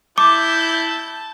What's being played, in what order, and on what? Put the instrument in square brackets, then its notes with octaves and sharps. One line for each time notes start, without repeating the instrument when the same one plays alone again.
[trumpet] E4 [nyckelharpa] A5 [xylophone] D6 [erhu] G6